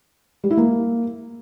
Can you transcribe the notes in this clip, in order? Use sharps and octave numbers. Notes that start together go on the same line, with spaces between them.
G3
E4
A#3